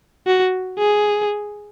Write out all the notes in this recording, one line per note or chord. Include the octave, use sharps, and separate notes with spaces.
F#4
G#4